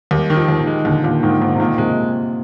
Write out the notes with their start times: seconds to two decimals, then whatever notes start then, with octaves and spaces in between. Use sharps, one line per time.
0.11 D#2 G3
0.30 D#3
0.36 F3
0.48 D#2
0.60 D#3
0.67 G#3
0.85 D#2 D3
1.04 D#2 A#2
1.23 G#2 D#3
1.41 D#2 G#2
1.55 C3
1.60 A#2 D#3
1.78 C3 G#3